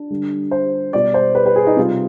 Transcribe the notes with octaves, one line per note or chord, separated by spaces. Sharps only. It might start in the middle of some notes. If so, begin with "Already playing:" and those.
Already playing: D4
D3 G3
C5
B2 G3 D5
C5
B4
B4
G#4
D#4
C3 G3 F4